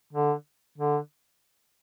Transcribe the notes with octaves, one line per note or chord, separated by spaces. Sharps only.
D3
D3